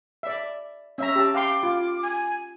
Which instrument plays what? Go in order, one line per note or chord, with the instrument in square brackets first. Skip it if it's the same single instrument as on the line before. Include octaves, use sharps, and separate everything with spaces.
[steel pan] D5 E5
[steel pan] C#4 E5 A#5 [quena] E6
[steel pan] G4 A5
[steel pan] F5 G5 C6 [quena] D6
[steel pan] F4
[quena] G#5